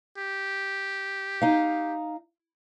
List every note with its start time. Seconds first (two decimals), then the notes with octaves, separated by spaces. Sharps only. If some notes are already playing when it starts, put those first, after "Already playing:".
0.18 G4
1.42 D#4 F5